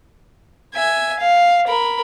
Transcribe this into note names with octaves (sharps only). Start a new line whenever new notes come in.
E5 G#5
F5
A#4 B5